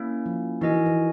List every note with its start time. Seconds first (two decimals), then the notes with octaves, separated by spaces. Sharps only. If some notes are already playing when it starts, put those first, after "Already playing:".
Already playing: A#3 C#4 E4
0.26 F3
0.61 E3 D#4 F#4 A#4 D#5 G#5
0.74 E3
0.86 E3